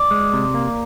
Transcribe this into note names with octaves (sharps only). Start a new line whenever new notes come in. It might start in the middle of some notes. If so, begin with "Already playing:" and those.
Already playing: D5
G#3
C3
A#3